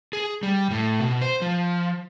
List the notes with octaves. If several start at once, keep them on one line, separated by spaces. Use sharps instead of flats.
G#4
G3
A2
B2
C5
F3